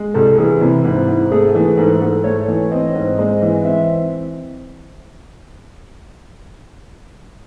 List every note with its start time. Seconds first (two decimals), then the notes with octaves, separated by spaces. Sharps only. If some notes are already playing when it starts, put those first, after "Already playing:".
Already playing: G#3
0.14 C2 A4
0.38 E3 G#4
0.61 C3 E4
0.84 G#2 E4
1.08 G#2
1.31 A3 G#4
1.55 E3
1.77 G#2 A4
2.02 G#2
2.24 A3 C#5
2.48 E3
2.71 C4 D#5
2.95 G#2
3.18 G#3
3.42 E3
3.64 C4 E5